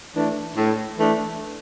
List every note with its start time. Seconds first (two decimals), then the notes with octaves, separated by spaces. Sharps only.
0.15 E3 A3 D4
0.56 A2
0.97 E3 A3 D4